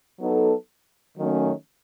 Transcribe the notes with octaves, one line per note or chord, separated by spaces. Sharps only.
F#3 B3 D#4 A4
D#3 F#3 A3 C#4